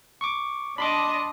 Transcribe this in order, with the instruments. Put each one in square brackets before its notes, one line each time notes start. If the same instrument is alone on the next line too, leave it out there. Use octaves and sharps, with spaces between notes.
[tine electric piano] C#6 D6
[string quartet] D4 D#5 A5 [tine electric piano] B5 C6 D6